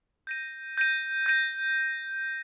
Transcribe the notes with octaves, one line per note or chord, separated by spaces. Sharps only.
G6 A#6 D#7
G6 A#6 D#7
G6 A#6 D#7